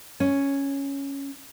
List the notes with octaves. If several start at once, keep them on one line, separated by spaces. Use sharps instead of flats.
C#4